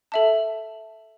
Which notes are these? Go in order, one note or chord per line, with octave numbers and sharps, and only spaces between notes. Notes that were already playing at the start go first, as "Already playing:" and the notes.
A4 E5 A5